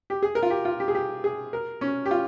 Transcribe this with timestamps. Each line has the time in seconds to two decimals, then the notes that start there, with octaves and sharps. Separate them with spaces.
0.10 G4
0.23 G#4
0.35 A#4
0.43 F4
0.50 G4
0.65 F4
0.80 G4
0.88 G#4
0.95 G4
1.24 G#4
1.53 A#4
1.81 C#4
2.06 G4
2.11 F4